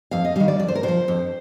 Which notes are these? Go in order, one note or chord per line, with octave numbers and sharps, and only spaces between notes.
F2 F5
D#5
D#3 G3 F5
D5
F2 D5
C5
A#4
D3 C5
F3
F2